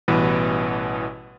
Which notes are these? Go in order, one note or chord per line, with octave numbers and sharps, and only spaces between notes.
A1 B2 E3 G3 B4